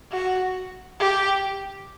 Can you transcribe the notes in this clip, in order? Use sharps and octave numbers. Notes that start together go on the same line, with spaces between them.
F#4
G4